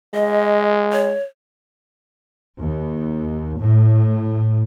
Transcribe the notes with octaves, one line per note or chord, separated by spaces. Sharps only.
G#3 D#5
C#5
D#2
A2